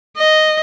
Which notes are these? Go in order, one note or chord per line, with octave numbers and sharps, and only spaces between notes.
D#5